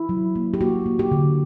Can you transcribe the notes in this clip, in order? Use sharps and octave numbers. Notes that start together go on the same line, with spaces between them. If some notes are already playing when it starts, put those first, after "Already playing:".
Already playing: E4
F#3
A#3
G4
A#3 F#4
A#3
G4
D3